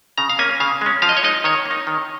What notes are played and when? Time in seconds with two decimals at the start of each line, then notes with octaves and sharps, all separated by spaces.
0.18 C#3 A#5
0.29 F5
0.39 A#3 C#4 G#5
0.60 C#3 F5
0.81 G#3 C#4
1.02 F3 F5
1.09 D#5
1.17 C#5
1.23 G#3 D#4 D#5
1.44 D#3 C#5
1.65 A#3
1.71 D#4
1.87 D#3